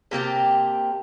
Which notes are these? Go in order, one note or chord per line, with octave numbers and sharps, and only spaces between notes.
C3 A#3 G4 A5